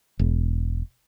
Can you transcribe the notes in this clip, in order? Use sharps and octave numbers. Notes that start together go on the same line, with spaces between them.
E1